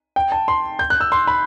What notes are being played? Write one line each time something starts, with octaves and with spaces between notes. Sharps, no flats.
G5
A5
C6
G6
F#6
E6
C6
B5